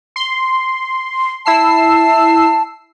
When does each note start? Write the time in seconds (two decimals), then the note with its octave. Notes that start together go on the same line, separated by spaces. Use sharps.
0.16 C6
1.46 E4 A5 E6 C7